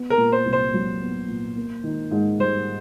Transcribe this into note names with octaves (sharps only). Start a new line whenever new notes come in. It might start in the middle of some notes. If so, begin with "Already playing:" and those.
Already playing: B3
A#4
A#2
C5
C2
C5
F#3
B3
A#2
A#3
D#3
G#2
G3 C5